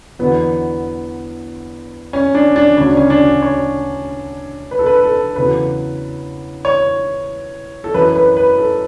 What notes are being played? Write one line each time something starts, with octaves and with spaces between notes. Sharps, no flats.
E2 D3 F#3 B3
C#4
D4
D4
D2 C#3 F#3 C#4
D4
C#4
D4
C#5
B4
A4
B4
A4
E2 C#3 F#3 B4
C#5
A4
F#2 E3 B4
B4
B4
A4